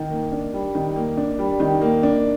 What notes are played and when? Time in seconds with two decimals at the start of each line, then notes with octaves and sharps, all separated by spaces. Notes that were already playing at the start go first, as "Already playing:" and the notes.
Already playing: D#3
0.10 A#3
0.32 D4
0.53 G3
0.75 D#3
0.96 A#3
1.17 D4
1.39 G3
1.60 D#3
1.81 A#3
2.03 D4